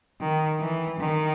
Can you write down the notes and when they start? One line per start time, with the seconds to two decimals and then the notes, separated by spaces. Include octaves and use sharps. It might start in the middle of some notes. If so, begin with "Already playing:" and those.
0.21 D#3
0.60 E3
0.99 D#3